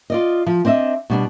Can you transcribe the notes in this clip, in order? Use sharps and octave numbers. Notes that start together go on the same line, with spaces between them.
F4 D5 D#5
F3
C4 D4 D#5 E5
B2 G3 D4